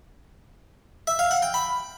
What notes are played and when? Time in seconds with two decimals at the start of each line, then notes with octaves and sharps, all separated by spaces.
1.07 E5
1.19 F5
1.31 F#5
1.42 G5
1.54 B5